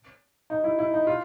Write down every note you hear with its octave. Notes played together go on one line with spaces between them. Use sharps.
D#4
E4
E4
D#4
F4